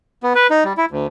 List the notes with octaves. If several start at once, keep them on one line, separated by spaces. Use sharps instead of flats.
B3
B4
D#4
G3
E4
D2